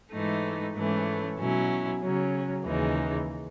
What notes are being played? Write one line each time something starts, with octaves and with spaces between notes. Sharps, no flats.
G#2 E3 A3 D#4
G#2 E3 A3 C#4
B2 F#3 C#4 E4
C#3 F#3 C#4
D#2 C#3 E3 G#3 D#4